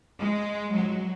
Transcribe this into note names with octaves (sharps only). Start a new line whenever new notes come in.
G#3
F#3